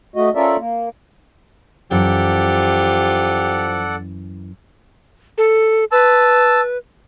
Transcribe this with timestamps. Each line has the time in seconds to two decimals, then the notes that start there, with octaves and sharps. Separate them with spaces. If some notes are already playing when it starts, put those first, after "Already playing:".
0.16 A3 F#4 D#5
0.35 C#4 F4 A4 A#4 D5 E5
0.58 A#3
1.91 F#2 E3 F3 G4 A4 D5 F#5
5.38 A4
5.92 B4 A5 E6